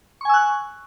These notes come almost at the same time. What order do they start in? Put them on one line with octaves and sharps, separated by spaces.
C#6 G#5 E6 F#6